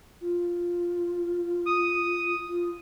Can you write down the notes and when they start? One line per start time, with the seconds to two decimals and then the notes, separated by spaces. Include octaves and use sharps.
0.21 F4
1.66 D#6
2.48 F4